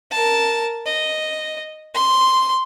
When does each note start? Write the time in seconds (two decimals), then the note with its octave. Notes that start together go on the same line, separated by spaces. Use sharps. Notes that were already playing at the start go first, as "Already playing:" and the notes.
0.11 A#4 A5
0.86 D#5
1.95 C6